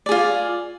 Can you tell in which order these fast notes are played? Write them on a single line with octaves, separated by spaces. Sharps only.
D5 G#4 F4